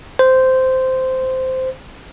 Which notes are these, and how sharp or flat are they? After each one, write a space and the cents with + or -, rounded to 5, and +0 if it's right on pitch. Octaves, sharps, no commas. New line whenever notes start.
C5 -10